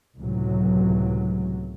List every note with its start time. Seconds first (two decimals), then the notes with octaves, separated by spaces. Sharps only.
0.19 C#2 A2 C3 E3 F#3